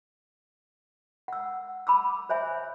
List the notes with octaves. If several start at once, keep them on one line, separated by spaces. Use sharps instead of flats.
F#5 E6
B5 D6 E6
C5 C#5 E5 G#5